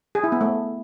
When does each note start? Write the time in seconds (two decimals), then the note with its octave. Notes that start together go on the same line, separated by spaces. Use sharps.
0.15 G#4
0.24 E4
0.32 B3
0.41 A3